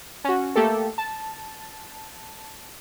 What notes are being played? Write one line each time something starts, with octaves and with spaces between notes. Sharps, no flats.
C#4 F#4
A3 A#3 G4 A4
A5